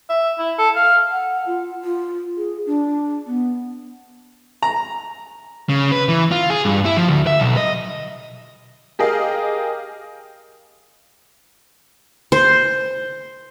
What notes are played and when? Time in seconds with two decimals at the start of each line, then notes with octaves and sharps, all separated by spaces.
0.10 E5
0.39 E4
0.59 A4
0.76 F5
1.11 F#5
1.47 F4
1.84 F4
2.37 G#4
2.66 D4
3.27 B3
4.63 A#5
5.69 C#3
5.92 B4
6.09 E3
6.32 F4
6.50 G#4
6.65 G2
6.85 E4
6.97 F3
7.08 D2
7.27 E5
7.40 B1
7.57 D#5
8.99 G4 G#4 A#4 D#5 F5
12.32 C5